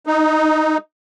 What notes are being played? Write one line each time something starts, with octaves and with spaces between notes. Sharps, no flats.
D#4